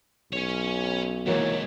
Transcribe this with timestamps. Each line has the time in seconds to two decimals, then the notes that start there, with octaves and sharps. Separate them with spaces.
0.33 B1 C#4 C#5
1.26 D#2 G#2 E3 A#3 F#4 C#5